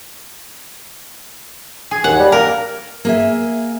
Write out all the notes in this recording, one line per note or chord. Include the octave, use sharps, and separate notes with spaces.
G#4
D#2 F#5
G3
A#3 A#4
A#3 G#4 E5